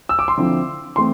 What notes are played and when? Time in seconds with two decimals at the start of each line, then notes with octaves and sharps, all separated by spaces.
0.09 E6
0.19 D6
0.28 C6
0.37 D3 F3 C4 E4
0.96 E3 A3 C4 C6